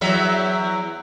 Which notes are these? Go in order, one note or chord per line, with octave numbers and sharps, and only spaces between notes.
E2 F#3 E5